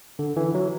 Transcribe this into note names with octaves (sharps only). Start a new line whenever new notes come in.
D3
E3
F#3